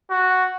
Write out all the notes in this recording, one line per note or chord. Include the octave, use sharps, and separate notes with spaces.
F#4